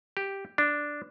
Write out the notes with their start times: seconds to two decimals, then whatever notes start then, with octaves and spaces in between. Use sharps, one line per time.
0.17 G4
0.58 D4